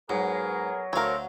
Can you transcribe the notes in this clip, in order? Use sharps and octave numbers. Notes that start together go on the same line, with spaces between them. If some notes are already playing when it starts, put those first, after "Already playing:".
G#2 F#3 B3 G#4 A#4
D2 A3 C4 A#4 C#5 F5